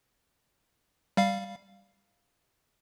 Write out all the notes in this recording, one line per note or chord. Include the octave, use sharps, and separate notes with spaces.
G3 F5